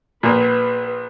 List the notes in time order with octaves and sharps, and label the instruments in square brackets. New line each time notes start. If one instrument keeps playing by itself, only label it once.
[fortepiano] A#1 A#2 [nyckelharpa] B4